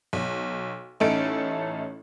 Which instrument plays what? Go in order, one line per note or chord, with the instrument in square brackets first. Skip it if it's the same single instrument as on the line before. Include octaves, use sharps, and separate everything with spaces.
[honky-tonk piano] B1
A1 A3 C#4 D#4 A4 D7